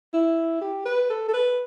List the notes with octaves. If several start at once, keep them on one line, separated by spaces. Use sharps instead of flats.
E4
G4
B4
A4
A4
B4